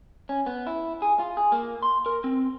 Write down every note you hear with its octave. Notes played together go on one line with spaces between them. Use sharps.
C#4
B3
E4
G#4
F4
G#4
A#3
C6
A#4
C4